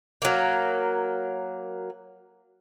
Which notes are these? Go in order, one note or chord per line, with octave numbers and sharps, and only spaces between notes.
F#3 A#3